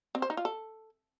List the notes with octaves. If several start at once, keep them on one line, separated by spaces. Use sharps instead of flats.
C4
C5
D#4
F4
A4